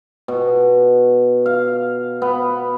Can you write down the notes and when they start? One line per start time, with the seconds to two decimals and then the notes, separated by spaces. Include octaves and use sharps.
0.28 B2
1.46 F5
2.22 B3